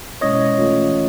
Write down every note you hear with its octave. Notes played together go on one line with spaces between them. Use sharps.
B2 G#3 C#4 E4 C#5 D#5
E3 A3 C#4 F4